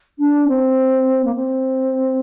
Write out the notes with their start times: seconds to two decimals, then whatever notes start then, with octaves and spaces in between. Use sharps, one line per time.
0.19 D4
0.48 C4
1.25 A#3
1.35 C4